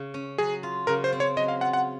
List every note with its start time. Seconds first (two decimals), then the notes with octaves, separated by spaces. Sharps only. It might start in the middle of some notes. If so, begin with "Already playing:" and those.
Already playing: C#3
0.14 C#4
0.38 F#3 G#4
0.63 F4
0.87 C#3 A#4
1.04 C5
1.12 C4
1.20 C#5
1.37 F#3 D#5
1.48 F5
1.61 F4 F#5
1.73 F#5